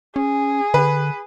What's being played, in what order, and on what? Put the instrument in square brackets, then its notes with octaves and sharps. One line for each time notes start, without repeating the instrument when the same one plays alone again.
[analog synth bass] C#4 [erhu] G#4
[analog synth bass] D3 [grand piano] B4